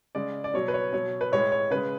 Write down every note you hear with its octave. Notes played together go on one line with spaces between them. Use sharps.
C#3 G#3 D5
D5
B2 F#3 C#5
B4
C#5
B2 F#3 C#5
B4
A2 G#3 C#5
C#5
C#3 G#3 B4